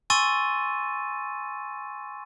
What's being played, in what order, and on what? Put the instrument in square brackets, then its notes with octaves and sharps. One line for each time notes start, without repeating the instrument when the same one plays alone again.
[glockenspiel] G#5 C6 C#6 E6 A6 D#7